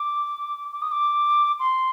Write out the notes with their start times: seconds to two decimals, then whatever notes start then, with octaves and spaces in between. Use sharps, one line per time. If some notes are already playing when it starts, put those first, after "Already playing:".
Already playing: D6
0.72 D6
0.82 D#6
0.92 D6
1.60 C6